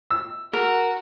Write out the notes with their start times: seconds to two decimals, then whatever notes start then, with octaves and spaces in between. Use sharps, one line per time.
0.11 E6
0.53 F#4 A#4